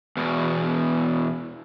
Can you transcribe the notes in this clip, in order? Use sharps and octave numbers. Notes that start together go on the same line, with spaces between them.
E2 B2